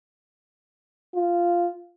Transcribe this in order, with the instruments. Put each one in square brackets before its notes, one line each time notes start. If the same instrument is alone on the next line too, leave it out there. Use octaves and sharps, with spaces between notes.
[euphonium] F4